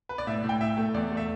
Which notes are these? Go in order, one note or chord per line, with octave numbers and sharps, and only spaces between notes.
B4
D5
A2 E5
A2
G5
A2 E5
A3
E2 D5
A3
E5